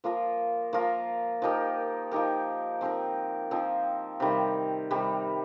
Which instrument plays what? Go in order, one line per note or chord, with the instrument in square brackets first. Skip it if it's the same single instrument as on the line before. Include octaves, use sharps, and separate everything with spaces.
[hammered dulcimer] F3 A#3 F4 A#4
F3 A#3 F4 A#4
F3 D#4 G4 A#4
F3 D#4 G4 A#4
F3 C4 D#4 A#4
F3 C4 D#4 A#4
C3 D#3 G3
C3 D#3 G3